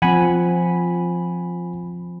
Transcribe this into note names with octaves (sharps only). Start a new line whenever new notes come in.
F3 C4 F#5 G#5 B5